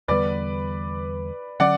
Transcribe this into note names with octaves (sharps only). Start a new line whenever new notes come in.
E2 D3 G3 B3 B4 D5
D3 F#3 C#4 D5 F#5